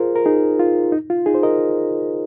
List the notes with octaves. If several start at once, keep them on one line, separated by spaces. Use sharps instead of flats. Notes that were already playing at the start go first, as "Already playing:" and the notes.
Already playing: F4 G#4 A#4 C5
A#4
D#4 G#4
F4
D#4
F4
D#4 G#4
C5
A#4 D#5